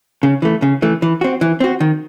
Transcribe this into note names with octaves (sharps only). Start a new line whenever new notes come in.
C#3
E3 A3
C#3
E3 A3
E3
C4 F#4
E3
C4 F#4
D#3